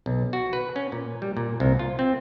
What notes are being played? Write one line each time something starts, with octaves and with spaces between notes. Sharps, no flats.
B1
F#4
B4
C#4
A#2
G3
A#2
C2
F4
C4